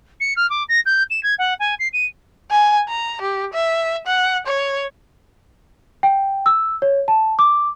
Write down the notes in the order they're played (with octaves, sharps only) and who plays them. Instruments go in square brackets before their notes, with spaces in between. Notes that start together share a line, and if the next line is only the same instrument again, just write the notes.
[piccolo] C#7
F6
D6
A#6
G6
E7
G#6
F#5
G#5
C7
D#7
[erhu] G#5
A#5
G4
E5
F#5
C#5
[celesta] G5
E6
C#5
A5
D6